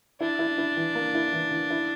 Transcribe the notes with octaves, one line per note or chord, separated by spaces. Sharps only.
D4 E4
E4
E4
E3
A#3
E4
E3
E3
E4